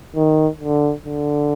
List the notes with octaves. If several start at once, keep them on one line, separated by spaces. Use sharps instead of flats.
D#3
D3
D3